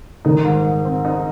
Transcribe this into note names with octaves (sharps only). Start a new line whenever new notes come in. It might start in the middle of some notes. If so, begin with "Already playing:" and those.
D#3 D#4
G#2
G#2
C4
D#4